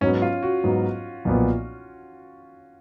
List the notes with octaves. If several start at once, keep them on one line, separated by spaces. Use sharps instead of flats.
G#2 F#3 B3 C#4
F4
F#4
G#2 F#3 B3
B1 A#2 F3 B3